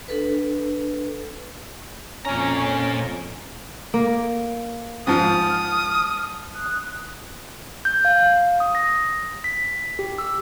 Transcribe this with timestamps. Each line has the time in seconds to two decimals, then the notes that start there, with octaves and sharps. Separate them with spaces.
0.08 D4 A4 B4
2.25 F2 A#2 C#4 A#5
3.94 A#3
5.07 G#2 F3 D#6 F6
6.54 D#6 F#6
7.85 G6
8.05 F5
8.60 D#6
8.75 A#6
9.44 B6
9.99 G4
10.18 E6